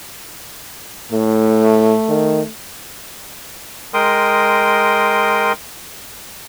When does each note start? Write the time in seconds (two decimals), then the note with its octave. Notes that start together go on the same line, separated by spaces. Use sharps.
1.12 A2 A3
2.09 D#3
3.94 G#3 A#4 G5 C6 D#6